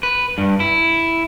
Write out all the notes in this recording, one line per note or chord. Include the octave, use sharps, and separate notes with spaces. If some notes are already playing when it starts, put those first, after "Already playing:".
B4
G2
E4